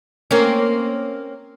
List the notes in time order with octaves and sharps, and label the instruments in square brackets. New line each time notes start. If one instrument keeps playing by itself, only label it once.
[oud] A#3 C4 C#4